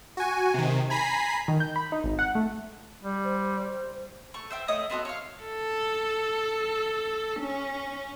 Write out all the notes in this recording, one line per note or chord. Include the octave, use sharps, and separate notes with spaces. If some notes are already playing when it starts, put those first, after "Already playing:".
F#4 G#5
C3 D#3
G#5 A#5 B5 B6 C7
D#3
G6
B5
D#4
G#1
F#5
A3
G3
C5
A3 C#6
C5 E5 G5
A3 C#5 D#5 D#6
B3 C4 F#4 A4
C#5 F5
A4
C#4